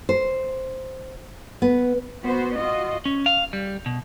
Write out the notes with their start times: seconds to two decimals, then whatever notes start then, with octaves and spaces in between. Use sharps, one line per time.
0.09 C5
1.62 B3
2.25 B3 F#4 C5
2.56 F4 F#4 D#5
3.06 C#4
3.26 F5
3.53 G3
3.86 B2